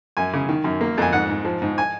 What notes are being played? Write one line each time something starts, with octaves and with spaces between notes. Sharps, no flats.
F#2 G#5
C#3
D#3
F#2
A#3
F2 G#5
G#2 F#5
G#2
F3
G#2
G#5